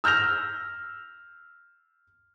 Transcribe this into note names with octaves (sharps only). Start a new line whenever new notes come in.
E6 F6 G6 A#6 F7